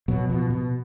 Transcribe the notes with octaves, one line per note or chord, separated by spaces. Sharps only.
B2 F#3
B2 F3
B2